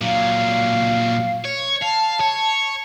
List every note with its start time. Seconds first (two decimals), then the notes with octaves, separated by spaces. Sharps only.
0.01 A#2 F#3 F5
1.45 C#5
1.82 F5 A5
2.20 C#5